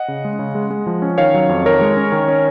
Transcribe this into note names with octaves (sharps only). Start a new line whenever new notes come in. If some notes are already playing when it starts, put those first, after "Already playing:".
Already playing: D#5 F#5
C#3
G#3
C#3
G#3
G#3
F3
C#4
D#3 C#5 F5
F#3
F2
D#3 A#4 C#5
G#3
C#4
D#3
C#4